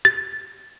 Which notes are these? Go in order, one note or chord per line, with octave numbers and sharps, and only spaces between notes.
A6